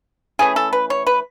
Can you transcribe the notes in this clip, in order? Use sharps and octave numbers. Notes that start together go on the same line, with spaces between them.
E3 A3 C#4 G#4
A4
B4
C#5
B4